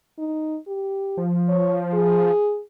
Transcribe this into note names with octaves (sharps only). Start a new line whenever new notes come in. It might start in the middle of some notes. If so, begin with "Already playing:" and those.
D#4
G4
F3
C#5
G#4